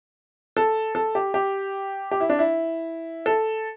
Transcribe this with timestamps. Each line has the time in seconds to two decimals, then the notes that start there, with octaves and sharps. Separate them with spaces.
0.57 A4
0.95 A4
1.15 G4
1.34 G4
2.11 G4
2.20 E4
2.29 D4
2.39 E4
3.26 A4